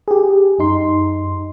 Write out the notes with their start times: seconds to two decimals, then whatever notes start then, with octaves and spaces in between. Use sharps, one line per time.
0.08 G4 G#4
0.59 F#2 D#4 C6